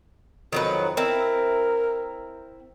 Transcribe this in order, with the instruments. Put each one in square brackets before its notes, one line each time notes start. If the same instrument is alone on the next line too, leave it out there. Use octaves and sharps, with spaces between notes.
[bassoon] F2 [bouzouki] D#3 F#3 B4
[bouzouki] C4 E4 [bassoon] A#4